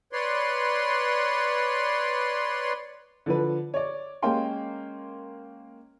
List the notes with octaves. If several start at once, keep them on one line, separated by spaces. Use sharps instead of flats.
B4 C#5 D5 C6
D3 F3 B4
C#5 D5
G#3 A#3 C#4 F5 G5 C6